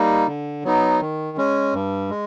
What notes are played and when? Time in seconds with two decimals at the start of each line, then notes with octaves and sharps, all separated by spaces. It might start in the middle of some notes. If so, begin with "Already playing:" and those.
Already playing: G3 A#3 D#4
0.27 D3
0.64 F#3 B3 D#4
1.00 D#3
1.37 G#3 C#4
1.74 G2
2.10 G#3